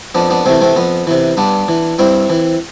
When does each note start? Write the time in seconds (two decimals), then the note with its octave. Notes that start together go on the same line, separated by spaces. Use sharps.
0.15 F2 B3 D4
0.30 B3 D4
0.45 C3 E3 A3 C4
0.61 A3 C4
0.76 F2 B3
1.07 C3 E3
1.37 G2 B3 D4
1.68 E3
1.99 G2 C4 E4
2.30 E3